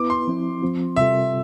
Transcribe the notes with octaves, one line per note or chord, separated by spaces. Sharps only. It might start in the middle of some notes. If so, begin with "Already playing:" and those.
Already playing: B3 E4 B4 D6
C6
F3 C4 E4
F3 C4 F4
C3 G3 C4 F4 A4 E5